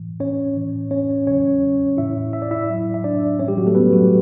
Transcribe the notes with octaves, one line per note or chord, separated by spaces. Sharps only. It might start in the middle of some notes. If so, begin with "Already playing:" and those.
Already playing: A2 E3
C#4 C#5
A2 E3
C#4 C#5
E2 C#3 F#3 C#4 C#5
A2 E3 E4 E5
E5
D5
E4 E5
A2 F#3
E5
D4 D5
A2 E3 C#4 C#5
G3 G4
F#3 F#4
A3 A4
B3 B4
F#3 F#4